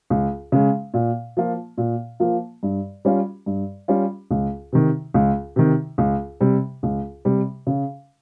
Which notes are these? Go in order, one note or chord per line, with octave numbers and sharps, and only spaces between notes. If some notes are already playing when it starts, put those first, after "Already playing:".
C#2
C#3 G#3
A#2
F3 A#3 F4
A#2
F3 A#3 F4
G2
G3 C#4 F4
G2
G3 C#4 F4
C#2
C3 D#3
C#2
C3 D#3
C#2
C3 G3
C#2
C3 G3
C#3